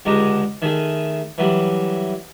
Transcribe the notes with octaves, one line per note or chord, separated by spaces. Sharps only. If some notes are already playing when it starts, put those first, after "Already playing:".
C#2 D3 G#3 G4 A#5
D#3 A3 G#4
E3 F#3 G3